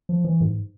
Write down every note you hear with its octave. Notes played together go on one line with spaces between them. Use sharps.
F3
E3
G#2